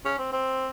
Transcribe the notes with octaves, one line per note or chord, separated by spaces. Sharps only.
C#4
C4
C4